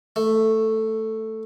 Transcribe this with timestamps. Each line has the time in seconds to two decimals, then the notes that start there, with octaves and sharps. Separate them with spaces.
0.16 A3